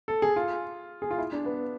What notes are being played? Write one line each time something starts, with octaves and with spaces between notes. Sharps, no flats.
A4
G#4
F4
G#4
F4
E4
D4
B3